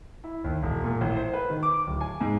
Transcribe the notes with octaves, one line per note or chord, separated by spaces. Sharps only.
E4
D#2
E1
A#2
A1
C5
B4
D#3
D6
D1
G#5
G#2